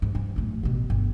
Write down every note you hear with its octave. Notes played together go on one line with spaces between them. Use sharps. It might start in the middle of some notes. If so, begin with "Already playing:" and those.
G#2
G2
F#2 A2
A1 B2
G1